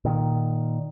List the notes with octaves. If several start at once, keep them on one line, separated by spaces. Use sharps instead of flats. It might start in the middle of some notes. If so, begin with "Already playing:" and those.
A#2 D#3